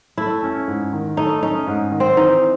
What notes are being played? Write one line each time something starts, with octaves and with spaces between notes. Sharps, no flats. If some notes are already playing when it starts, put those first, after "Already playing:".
A3 E4
C#4
G#2
D#3
A3 D#4
C#4 D#4
G#2
D#3
C4
E3 D#4